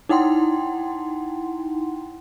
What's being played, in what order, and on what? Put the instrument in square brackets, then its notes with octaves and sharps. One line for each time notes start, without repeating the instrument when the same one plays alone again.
[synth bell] D#4 E4 F#5 G5 C6